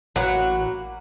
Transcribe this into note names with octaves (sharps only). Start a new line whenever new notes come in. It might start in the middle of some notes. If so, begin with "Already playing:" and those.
A1 F#3 A#3 B4 F#5